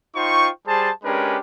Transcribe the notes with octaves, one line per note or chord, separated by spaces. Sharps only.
D#4 F4 C5 G5 C#6
G3 G#4 C5 A5
G#3 C#4 D4 G4 A#4 B4